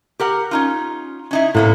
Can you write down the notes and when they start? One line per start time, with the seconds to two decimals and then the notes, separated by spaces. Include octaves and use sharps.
0.20 G4 A#4 F#5
0.51 C#4 D#4 F4
1.31 C#4 D#4 E4
1.54 A2 C3 A#3 B3